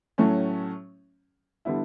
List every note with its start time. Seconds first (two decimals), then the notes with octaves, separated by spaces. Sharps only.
0.18 A2 F#3 A3 C#4
1.65 D3 G3 B3 E4